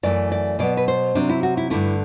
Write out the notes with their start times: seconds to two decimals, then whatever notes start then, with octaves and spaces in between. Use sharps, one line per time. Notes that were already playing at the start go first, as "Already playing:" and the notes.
0.03 F#2 E3 A3 D5
0.32 D5
0.59 B2 F#3 B3 D5
0.77 B4
0.88 C5
1.15 C3 F#3 C4 D4
1.29 E4
1.43 F#4
1.57 E4
1.70 G2 D3 A3 E4